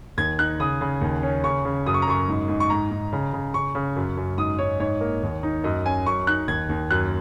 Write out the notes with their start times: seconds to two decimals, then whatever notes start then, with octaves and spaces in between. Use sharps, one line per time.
0.17 D#2 G#6
0.39 D#4 F#6
0.60 C#3 D#6
0.81 C#3
1.01 D#2
1.23 C#4
1.44 C#3 C#6
1.65 C#3
1.86 F#2 D#6
1.94 C#6
2.02 A#5
2.07 F#2 C#6
2.29 G#2
2.48 G#2
2.60 C#6
2.70 G#2 A#5
2.91 G#2
3.12 C#3
3.33 C#3
3.54 C#3 C#6
3.75 C#3
3.96 F#2
4.17 F#2
4.38 G#2 D#6
4.59 G#2 C#5
4.80 G#2 C#5
5.01 A#3
5.23 D#2
5.43 D#4
5.64 F#2 D#5
5.85 C#4 G#5
6.06 F#2 C#6
6.27 D#4 F#6
6.48 D#2 G#6
6.69 D#2
6.91 F#2 F#6